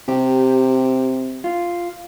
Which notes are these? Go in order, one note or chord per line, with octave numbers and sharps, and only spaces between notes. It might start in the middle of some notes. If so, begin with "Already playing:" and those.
C3 G4
F4